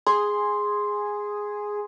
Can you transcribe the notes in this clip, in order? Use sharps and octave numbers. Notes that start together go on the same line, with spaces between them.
G#4 C6